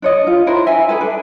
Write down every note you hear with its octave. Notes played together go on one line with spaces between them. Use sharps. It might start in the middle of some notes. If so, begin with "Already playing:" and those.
D4 C#5 D#5
F4
D4 E4 A#4 C5
D#5 E5 G#5
G#4 A4 B4 G#5
D4